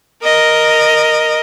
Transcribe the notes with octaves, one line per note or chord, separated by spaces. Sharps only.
A#4 D#5